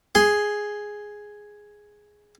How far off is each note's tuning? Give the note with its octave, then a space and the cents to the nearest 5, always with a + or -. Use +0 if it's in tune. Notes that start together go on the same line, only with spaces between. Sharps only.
G#4 +0 C6 +0